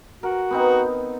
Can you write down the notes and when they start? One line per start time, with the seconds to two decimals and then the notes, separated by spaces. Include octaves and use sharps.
0.23 F#4 A#4
0.51 B3 C4 D#4